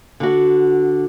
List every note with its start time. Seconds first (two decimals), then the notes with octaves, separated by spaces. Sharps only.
0.20 D3 F#4